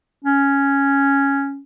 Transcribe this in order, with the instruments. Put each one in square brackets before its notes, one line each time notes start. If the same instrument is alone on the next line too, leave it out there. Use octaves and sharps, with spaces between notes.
[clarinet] C#4